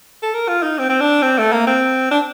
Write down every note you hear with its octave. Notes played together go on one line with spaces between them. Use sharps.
A4
A#4
F4
D#4
C4
C4
D4
C4
A3
A#3
C4
D4